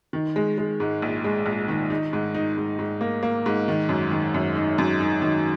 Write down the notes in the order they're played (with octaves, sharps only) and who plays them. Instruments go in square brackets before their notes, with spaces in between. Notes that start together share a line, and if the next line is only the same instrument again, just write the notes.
[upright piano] D#3
G#3
G#3
G#2
A#1
G#3
A#1
D#3
D#4
G#2
D#4
G#2
G#2
A#3
A#3
G#2
D#3
F#2
D#3
F#2
D#4
F#2
D#4
D#3